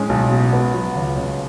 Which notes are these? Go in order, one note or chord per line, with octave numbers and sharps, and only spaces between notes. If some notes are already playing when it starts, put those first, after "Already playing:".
Already playing: A2 G#3 C#4
B1
B2
B3
F#3
C#2
C#3